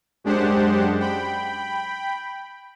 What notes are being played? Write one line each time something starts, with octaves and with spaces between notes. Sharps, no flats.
F#2 G#3 D4 G4 C5 F#5
G5 B5